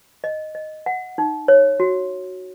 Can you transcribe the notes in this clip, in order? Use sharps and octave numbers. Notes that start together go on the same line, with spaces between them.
D#5
D#5
F#5
D#4
C#5
F#4